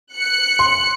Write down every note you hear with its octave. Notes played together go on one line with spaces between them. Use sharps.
F#6 C#7
C6